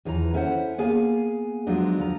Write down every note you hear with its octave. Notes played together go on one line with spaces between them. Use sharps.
E2 E3 F3 A#5
B3 C#4 E4 A4 C5 F#5
A#3 B3 G#4 F5 G#5
F3 F#3 G#3 B3 D4 D#4
D2 F3 A#5